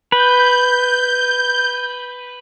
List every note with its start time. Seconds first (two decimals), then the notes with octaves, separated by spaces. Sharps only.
0.12 B4 G6